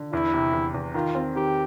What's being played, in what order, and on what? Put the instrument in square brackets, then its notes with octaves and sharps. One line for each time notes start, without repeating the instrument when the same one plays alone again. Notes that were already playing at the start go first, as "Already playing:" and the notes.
Already playing: [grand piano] D3
[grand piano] E2 [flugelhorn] E4
[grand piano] C3
E2
E2
[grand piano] D#3 [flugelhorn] F4
[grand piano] C4
[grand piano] D#3 [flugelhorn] G4